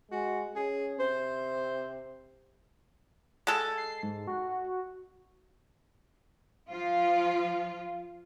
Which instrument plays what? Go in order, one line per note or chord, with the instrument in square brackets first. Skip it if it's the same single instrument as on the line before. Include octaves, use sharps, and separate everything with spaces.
[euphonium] G#3 [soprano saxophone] F#4
[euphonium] C#4 [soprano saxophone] G#4
[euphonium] C3 [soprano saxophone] C5
[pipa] G#3 A4
[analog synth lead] C7
G#2
F#4
[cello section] F3 F4